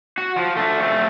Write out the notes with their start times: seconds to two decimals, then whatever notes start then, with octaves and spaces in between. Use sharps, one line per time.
0.18 F#4
0.37 F3
0.57 A3 D4
0.82 A3 C4